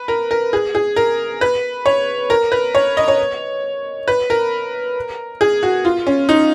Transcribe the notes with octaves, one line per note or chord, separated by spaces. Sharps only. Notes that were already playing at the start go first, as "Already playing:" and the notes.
Already playing: B4
A#4
A#4
G#4
G#4
A#4
B4
C#5
A#4
B4
C#5
D#5
C#5
B4
A#4
G#4
F#4
F4
C#4
D#4